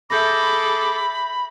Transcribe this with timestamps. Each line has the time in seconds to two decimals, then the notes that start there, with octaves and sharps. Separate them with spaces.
0.10 G#4 A4 E5 B5 D6 G6 A#6